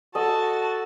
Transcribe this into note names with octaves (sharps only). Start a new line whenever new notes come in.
F#4 A4 D#5 A5